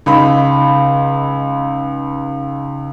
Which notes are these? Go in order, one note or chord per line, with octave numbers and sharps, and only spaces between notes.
C#2 D#4 B5